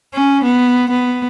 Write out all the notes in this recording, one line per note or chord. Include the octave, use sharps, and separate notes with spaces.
C#4
B3
B3